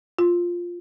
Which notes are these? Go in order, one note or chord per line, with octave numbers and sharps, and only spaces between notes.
F4